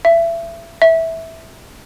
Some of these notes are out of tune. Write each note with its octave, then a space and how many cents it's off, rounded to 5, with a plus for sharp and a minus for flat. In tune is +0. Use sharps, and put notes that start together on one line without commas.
E5 +30
E5 -10